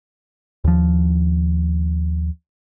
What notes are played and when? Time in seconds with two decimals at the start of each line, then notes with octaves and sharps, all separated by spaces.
0.64 D#2 F3